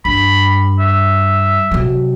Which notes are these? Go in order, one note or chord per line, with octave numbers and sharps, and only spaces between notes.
G2 B5
E5
C3 F#3